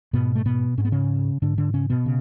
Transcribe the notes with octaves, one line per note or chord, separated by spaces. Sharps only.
G#2 B2 B3
A3
B2 B3
G#2 C#4
B3
C#3 C#4
G#2 D3 D4
D3 D4
C#3 C#4
B2 B3
C#3